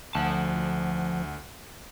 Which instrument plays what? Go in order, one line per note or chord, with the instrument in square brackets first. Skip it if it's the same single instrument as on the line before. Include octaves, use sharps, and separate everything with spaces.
[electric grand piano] D2 F#5 [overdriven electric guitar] F3 A5